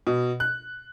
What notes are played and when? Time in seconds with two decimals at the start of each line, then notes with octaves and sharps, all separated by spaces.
0.07 B2
0.40 F#6